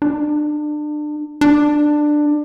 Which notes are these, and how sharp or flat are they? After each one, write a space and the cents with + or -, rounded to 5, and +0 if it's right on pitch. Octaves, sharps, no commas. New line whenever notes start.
D4 +30
D4 +15